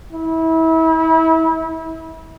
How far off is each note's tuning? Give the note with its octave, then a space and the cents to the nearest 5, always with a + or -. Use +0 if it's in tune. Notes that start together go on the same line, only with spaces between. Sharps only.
E4 -30